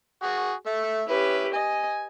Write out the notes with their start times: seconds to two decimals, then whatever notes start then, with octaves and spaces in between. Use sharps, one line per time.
0.23 F#4 G#4
0.66 A3 E5
1.08 C#4 E4 G4 B4
1.54 D#5 G#5